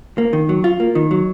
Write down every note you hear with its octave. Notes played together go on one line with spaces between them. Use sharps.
A#3
D#3
F#3
F4
A#3
D#3
F#3